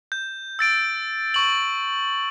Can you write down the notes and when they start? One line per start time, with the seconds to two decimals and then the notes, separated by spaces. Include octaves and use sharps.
0.12 G6
0.59 E6 A6 D7
1.34 C#6 F#7